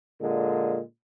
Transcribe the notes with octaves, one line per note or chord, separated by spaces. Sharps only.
A#2 D3 G#3